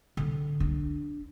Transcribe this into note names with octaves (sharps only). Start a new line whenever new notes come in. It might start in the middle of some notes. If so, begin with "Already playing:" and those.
D3
D4